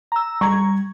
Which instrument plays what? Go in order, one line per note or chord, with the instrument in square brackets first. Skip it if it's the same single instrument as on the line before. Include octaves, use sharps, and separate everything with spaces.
[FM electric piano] A#5 E6
[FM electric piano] G3 G#6 [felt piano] A#5 C#6